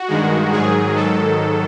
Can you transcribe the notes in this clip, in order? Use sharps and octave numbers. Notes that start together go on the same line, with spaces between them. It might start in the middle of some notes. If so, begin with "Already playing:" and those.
Already playing: F#4
G2 D#3 G#3
G#2 D#3 F#3 G#4
G#2 D#3 F#3 A4